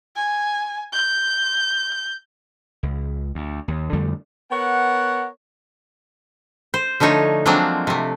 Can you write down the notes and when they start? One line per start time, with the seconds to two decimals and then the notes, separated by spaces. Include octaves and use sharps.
0.16 G#5
0.93 G6
2.83 C#2
3.35 D2
3.68 D#2
3.93 F2 D3 G3 A3
4.51 B3 A#4 C#5 F#5
6.74 C5
7.00 D3 F3 A3 D#4 C#5
7.46 F3 F#3 G#3 A#3 C4 D4
7.87 C3 A3